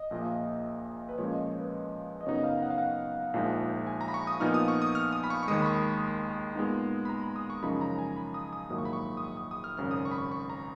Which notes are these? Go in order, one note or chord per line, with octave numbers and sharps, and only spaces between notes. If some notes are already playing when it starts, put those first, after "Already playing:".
Already playing: D#5
A#1 A#2 F3 A#3
B4
A#2 F3 G#3 C#4 C#5
D#5
C#5
B4
D#5
F#2 C#3 F#3 B3 D#4 C#5
D#5
F5
F#5
F5
F#5
A#1 A#2 F3 G#3 D#4
G#5
A#5
B5
C#6
D#6
A#2 F3 B3 D#4 F6
D#6
C#6
D#6
F6
D#6
B5
C#6
C#6
D#2 D#3 G#3 D#6
B5
C#6
A#2 G#3 B3 D#4
B5
A#5
B5
D#6
C#6
F#2 C#3 F3 G#3 D#4 B5
A#5
G#5
B5
D#6
D#6
A#1 G#2 D#3 F#3 A#3 D#6
C#6
B5
C#6
D#6
C#6
D#6
D#6
F6
G#1 F#2 C#3 F6
D#6
C#6
B5
C#6
C#6
A#5